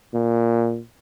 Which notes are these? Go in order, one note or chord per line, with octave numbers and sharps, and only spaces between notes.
A#2